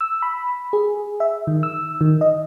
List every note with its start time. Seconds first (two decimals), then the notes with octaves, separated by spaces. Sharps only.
0.01 E6
0.22 B5
0.73 G#4
1.20 E5
1.47 D#3
1.63 E6
2.01 D#3
2.21 D#5